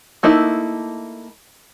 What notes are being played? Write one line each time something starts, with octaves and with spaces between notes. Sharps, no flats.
A3 A#3 D#4 E4